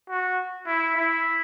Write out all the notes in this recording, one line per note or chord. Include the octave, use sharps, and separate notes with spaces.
F#4
E4
E4